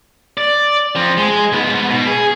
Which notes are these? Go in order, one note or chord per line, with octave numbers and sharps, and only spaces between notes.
D5
F3 C4
G#3
G#2 B3
B2
G#4